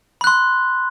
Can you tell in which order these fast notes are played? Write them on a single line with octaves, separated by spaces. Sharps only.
B5 F#6 C6